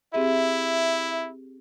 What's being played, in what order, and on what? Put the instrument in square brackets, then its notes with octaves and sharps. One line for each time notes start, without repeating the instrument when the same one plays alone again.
[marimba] C4 G4 G#4 [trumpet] E4 [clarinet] E5